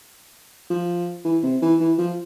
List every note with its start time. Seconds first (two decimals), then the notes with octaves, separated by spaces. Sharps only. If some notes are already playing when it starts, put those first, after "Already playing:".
0.70 F3
1.25 E3
1.43 C3
1.62 E3
1.80 E3
1.98 F3